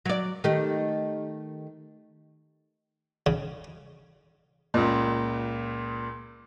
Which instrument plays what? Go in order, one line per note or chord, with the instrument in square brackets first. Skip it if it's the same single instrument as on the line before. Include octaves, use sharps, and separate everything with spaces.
[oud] F#3 D5
D#3 A3 G4
[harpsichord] C#3
[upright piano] C#2 A#2